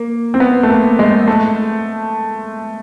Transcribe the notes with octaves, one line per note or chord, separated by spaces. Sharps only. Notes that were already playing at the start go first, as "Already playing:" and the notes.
Already playing: A#3
C4
B3
A3
A#3
G#3
A3